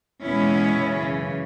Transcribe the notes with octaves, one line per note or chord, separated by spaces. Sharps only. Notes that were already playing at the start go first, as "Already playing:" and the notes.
E2 B2 G#3 B3 C#4 E4
F#2 C#3 E3